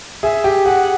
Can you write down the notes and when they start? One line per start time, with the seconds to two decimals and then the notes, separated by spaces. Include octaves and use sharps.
0.23 G#4 E5
0.44 G4
0.66 G#4 F#5